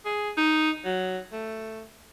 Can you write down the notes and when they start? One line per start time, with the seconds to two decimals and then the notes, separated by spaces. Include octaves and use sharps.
0.06 G#4
0.37 D#4
0.85 F#3
1.32 A3